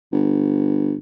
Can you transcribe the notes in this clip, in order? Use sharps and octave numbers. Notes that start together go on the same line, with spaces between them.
G1